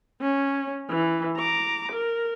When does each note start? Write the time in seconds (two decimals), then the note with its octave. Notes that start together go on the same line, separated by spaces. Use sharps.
0.21 C#4
0.89 E3
1.37 A#5 D6
1.92 A#4